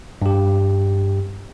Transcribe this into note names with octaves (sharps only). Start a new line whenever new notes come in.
G2 G4